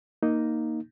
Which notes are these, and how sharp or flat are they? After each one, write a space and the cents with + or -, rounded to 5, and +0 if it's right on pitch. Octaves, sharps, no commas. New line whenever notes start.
A#3 +0 D#4 +0